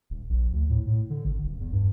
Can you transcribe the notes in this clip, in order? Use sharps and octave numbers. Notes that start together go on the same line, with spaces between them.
D#1
A#1
D2
A2
A2
D3
G#1
D#1
E2
G2